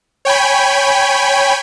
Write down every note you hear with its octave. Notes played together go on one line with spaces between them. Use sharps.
C#5 G5 G#5 B5